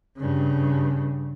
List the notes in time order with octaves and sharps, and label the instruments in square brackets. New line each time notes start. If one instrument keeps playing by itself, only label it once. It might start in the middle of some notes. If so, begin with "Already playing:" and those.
[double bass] G2 C#3